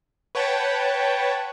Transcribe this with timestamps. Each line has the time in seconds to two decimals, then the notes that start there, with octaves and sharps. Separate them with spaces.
0.35 B4 C#5 F#5 G5 A5